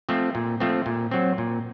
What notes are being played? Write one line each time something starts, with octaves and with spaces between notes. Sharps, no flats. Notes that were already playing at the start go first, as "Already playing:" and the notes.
F3 A3 C4
A#2
F3 A3 C4
A#2
F#3 C4
A#2